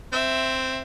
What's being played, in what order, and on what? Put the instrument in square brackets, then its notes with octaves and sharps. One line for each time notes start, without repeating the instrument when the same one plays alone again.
[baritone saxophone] C4 [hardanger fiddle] E5